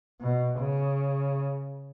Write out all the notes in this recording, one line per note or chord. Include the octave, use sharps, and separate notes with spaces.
B2
C#3